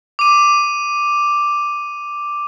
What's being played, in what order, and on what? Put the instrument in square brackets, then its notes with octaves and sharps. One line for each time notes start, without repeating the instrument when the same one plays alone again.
[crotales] D6 D#7